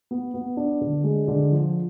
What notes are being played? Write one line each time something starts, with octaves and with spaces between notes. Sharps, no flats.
B3
B3
D4
D3
G#3
D3
F3